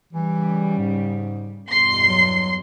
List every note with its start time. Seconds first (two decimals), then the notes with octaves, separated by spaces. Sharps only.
0.13 C#3 E3 G3
0.78 G#2
1.67 E2 G2 B2 C6 C7
2.08 F#3